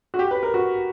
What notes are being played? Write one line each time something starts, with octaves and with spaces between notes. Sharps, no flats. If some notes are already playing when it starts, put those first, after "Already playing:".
F#4
G4
B4
A#4
F#4